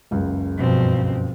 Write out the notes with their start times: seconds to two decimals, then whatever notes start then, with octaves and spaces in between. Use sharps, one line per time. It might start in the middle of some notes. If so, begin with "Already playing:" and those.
0.11 F#1 C#2
0.58 G2 B2 F3 C4